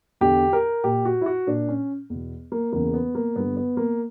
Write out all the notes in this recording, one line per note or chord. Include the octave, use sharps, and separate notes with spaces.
E2 D3 G4
A#4
A#2 G4
F#4
E4
F#4
A#2 D4
C#4
E2 B2
A#3
E2 C#3 E3 A#3
B3
A#3
G2 D3 B3
B3
A#3